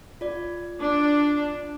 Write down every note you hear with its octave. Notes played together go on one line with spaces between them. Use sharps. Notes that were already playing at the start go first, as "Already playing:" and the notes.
F4 D5
D4